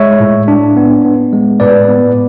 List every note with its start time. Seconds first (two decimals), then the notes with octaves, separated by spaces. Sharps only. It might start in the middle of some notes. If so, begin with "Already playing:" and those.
Already playing: G#3 C#5 E5
0.20 A2
0.48 D4
0.77 B3
1.05 B3
1.33 G#3
1.60 A2 B4 D5
1.89 B3